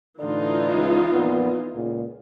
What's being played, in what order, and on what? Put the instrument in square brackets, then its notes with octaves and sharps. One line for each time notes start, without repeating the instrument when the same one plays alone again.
[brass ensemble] A2 D3 D4 [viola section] E3 D#4 F4
[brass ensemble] C#2
F2 A#2 B3
C#2 A#2